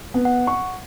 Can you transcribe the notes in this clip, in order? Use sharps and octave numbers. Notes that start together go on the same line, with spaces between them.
B3
F#5
C#6